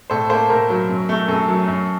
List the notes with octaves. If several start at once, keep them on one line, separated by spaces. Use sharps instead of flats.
A2 A4 C5
A#3 A4 C5
A2 A#4
F#3
F#2
A3
F#2 A4
F#3
F#2